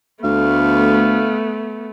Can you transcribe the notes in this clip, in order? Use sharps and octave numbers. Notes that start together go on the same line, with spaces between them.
D2 A3 B3 F5